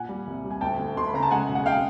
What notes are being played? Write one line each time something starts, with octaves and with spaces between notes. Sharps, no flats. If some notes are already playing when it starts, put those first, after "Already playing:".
Already playing: A#2 F#5 G#5
G3
C2
G3
G#5
D2 G5 A5
D2
D2 C6
B5
C#3 A#5
A5
G#3 F#5 G#5
B1
F#5
G#3 F5 G5